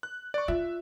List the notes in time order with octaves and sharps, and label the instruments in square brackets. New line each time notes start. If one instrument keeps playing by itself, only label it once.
[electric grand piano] F#6
D5 C#6
[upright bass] F4 [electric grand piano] E5